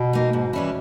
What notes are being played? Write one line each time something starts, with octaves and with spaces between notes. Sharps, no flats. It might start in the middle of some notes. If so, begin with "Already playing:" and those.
Already playing: B2
A#3 D#4
G#2
E3 G3 C#4 E4